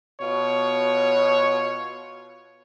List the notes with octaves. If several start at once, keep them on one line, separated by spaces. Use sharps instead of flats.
B2 F4 C#5